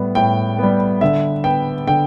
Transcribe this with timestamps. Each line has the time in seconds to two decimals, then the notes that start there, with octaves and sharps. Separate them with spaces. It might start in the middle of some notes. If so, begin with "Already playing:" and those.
Already playing: A2 G3 B3
0.15 A2 G5
0.58 G3 B3
1.01 D3 E5
1.44 B3 G5
1.87 D3 G5